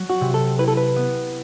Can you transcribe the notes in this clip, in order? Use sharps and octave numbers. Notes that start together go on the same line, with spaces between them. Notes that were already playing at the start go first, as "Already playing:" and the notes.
Already playing: F#3
F#4
C3
A4
E4 B4
A4
B4
B3